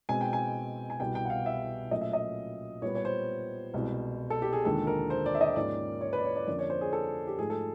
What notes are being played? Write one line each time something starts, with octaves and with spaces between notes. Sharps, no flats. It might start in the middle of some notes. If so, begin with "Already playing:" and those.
B2 G#3 C4 G#5
G5
G#5
G#5
C2 B2 G3 B3 G5
G5
F#5
F5
E5
A#2 F#3 A3 C#4 D#5
E5
D#5
A#2 G3 B3 C#5
C#5
C5
C2 B2 G#3
A4
G4
G#4
D#2 D3 F3 G#3 A4
A#4
C5
D5
E5
D#5
G#2 F3 A#3 C#4 D5
C#5
B4
D5
C#5
D5
F2 D3 F3 A#3 C#4 D5
C#5
C5
G#4
A4
G4
G#2 F3 A3 G#4
A4